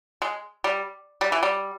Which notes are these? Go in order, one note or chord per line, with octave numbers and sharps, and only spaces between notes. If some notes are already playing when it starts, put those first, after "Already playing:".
G#3
G3
G3
E3
G3